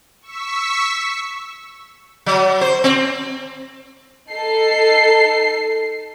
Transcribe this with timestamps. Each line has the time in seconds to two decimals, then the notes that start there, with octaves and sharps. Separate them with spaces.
0.22 C#6 E6 B6
2.26 F#3
2.61 C5
2.84 C4
4.31 D#4 A4 C7